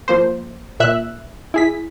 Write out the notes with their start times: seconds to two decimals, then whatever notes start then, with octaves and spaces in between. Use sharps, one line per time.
0.08 F3 A#3 C5
0.80 A#2 E5 F#6
1.54 E4 G#4 B6